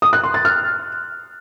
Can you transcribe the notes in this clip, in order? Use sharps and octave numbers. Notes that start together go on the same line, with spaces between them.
D#6
F#6
C6
A6
F6